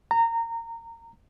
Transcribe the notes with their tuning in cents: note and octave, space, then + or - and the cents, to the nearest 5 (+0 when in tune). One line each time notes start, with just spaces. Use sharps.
A#5 -20